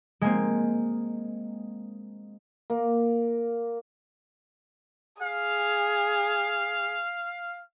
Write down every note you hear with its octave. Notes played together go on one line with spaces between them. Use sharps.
G#3 A#3 C4
A#3
G#4 F5